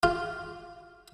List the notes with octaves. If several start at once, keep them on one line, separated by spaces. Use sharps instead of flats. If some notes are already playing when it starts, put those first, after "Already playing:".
F4